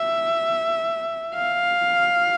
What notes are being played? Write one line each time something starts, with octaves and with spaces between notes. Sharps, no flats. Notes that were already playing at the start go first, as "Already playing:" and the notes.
Already playing: E5
F5